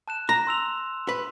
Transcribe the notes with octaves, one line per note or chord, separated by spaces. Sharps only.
A5 F#6 E7
A#5
C6 E6 F7
B4